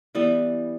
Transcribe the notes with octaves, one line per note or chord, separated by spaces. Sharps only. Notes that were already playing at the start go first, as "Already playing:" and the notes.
E3 G3 B3